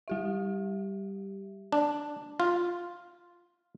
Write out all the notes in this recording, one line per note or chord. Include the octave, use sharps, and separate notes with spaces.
G3 G4 E5
D4
F4